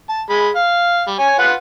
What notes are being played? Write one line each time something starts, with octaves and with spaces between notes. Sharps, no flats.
A5
G#3 B5
F5
G3
C#5 G#5
F4 B4 F#5